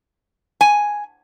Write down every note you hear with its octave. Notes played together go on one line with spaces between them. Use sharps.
G#5